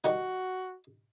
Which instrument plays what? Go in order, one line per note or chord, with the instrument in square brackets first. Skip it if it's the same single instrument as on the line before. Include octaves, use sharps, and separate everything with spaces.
[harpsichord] D#3 G3 D#4 [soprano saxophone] F#4